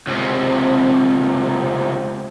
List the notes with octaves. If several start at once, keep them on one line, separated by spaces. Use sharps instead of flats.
C#2 C3